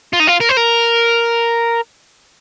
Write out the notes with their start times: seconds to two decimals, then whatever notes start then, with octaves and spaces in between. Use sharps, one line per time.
0.13 F4
0.20 D#4
0.27 F4
0.40 A#4
0.49 C5
0.57 A#4